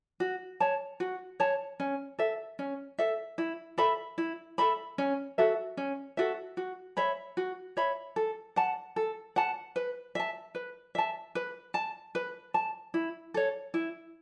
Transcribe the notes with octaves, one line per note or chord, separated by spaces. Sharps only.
F#4
C#5 A5
F#4
C#5 A5
C#4
A4 E5
C#4
A4 E5
E4
A4 E5 B5
E4
A4 E5 B5
C#4
F#4 A4 E5
C#4
F#4 A4 E5
F#4
C#5 E5 B5
F#4
C#5 E5 B5
A4
F#5 A5
A4
F#5 A5
B4
E5 A5
B4
E5 A5
B4
A5
B4
A5
E4
A4 C#5
E4